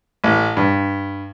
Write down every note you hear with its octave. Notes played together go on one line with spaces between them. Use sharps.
A1
G2